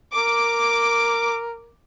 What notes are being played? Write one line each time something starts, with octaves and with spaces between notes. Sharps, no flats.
A#4 D6